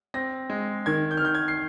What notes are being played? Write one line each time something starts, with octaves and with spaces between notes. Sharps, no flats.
C4 A#6
G#3
D#3 G#6
G6
F6
D#3 G6
G#6
C7